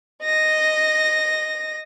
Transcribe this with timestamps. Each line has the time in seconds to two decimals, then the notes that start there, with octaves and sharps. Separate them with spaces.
0.24 D#5 A#6